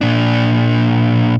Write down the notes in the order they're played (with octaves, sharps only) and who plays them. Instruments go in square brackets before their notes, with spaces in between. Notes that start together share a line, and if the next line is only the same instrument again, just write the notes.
[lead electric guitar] A#2 D4